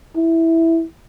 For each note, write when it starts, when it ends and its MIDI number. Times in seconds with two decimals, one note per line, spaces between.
0.16 0.84 64